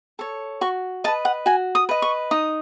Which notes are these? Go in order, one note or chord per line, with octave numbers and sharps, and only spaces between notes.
A4 C#5
F#4 C#6
B4 D#5 A5
F#5
F#4 G#5
D#6
B4 D#5
C#6
D#4 D#6